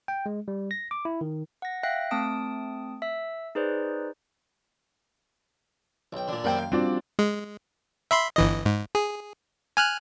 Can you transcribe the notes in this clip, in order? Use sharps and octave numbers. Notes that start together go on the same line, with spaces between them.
G5
G#3
G3
A#6
D6
E4
D#3
F#5 A#6
E5 F5 G5 F#6 A#6
A3 C4 A5 D#6 D7
E5 E6
D#4 G#4 B4 C5 D5
B1 G5
A#2 D3
F#2 G3 A#3 C4 C#4 G5
F5
G3 C4 D4 F4 F#4 D5
G#3
E5 B5 C6
G1 E3 D#5
G#2
G#4
G#5 F6 F#6